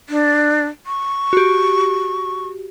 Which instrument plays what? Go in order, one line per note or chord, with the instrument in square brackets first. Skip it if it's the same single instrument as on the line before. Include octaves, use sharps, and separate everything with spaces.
[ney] D4
C#6
[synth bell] F#4 G4